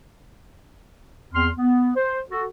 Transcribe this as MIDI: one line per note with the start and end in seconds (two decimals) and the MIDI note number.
1.33 1.49 40
1.33 1.49 60
1.33 1.49 84
1.33 1.49 89
1.58 1.91 59
1.96 2.20 72
2.30 2.45 66
2.30 2.45 69